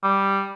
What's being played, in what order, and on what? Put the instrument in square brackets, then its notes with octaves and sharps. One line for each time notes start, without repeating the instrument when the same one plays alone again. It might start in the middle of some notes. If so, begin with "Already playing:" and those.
[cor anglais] G3